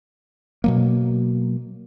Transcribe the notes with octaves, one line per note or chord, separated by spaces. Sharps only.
B2 F#3 A#3